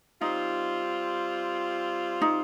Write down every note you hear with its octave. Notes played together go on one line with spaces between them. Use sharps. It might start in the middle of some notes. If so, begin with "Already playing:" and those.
G3 C4 D#4 F4
D#4